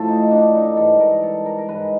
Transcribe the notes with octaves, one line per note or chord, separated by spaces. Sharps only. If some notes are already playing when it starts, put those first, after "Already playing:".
Already playing: A2 F3 A3 A4
D#4
D4
D#4
G#2 E3 G3 A4
A#4
A4
A#4
A#4
G#2 E3 G#3 B4